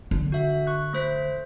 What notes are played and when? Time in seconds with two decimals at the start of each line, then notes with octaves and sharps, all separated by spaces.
0.11 D3
0.32 F#4 E5
0.67 C#6 F#6
0.93 A3 C5 B6